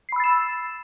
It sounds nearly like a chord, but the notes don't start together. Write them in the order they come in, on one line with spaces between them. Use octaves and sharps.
C7 B5 E6 A6 E7